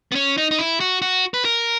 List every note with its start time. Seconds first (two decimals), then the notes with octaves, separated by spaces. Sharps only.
0.12 B3
0.15 C#4
0.38 D#4
0.51 D#4
0.59 E4
0.80 F#4
1.02 F#4
1.34 B4
1.45 A#4